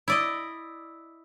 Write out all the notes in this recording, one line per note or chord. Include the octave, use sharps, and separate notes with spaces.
E4 D5 D#5